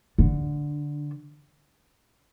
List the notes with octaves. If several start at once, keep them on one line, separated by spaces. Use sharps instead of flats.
D3